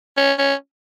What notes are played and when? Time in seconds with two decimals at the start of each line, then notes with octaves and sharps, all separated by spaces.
0.17 C#4
0.39 C#4